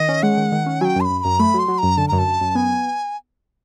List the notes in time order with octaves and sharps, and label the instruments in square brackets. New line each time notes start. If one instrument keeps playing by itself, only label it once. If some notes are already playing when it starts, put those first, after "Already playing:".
Already playing: [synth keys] D#3 [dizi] D#5
[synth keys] C#4
[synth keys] G#3 [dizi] F#5
[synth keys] D#3
D#3
C#4
[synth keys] F#3 [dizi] G5 G#5
[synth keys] F#2 [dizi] C6
[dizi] B5
[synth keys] F#2
[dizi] B5
[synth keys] F#2 [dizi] A#5
[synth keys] A3 [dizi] B5
[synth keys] F#3 [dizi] C6
[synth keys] F#3
[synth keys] F#2 [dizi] A#5
[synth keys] D3 [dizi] A5
[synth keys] F#2 [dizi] A#5
[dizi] A5
[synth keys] F#2
F#2
[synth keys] B3 [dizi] G#5